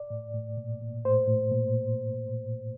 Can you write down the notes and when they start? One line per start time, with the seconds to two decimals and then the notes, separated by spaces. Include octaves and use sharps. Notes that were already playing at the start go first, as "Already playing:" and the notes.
Already playing: D5
0.10 A2
0.34 A2
0.57 A#2
0.81 A#2
1.05 A2 C5
1.28 A2
1.52 A#2